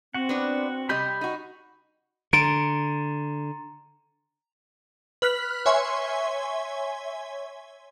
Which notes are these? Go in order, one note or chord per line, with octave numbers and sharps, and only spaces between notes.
C4 F#4 F#5
B3 D4 D5
C3 G3 D#5 B5 G6
D#4 F#4
D3 A#5 C6 A6 D7
B4 F6 F#6 B6
C#5 E5 G#5 C6 C#6